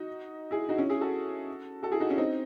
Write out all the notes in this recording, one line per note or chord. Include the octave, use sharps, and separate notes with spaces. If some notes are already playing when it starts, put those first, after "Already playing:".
Already playing: D#4 F#4
E4 G#4
D#4 F#4
C#4 E4
E4 G#4
F#4 A4
F#4 A4
E4 G#4
D#4 F#4
C#4 E4
C4 D#4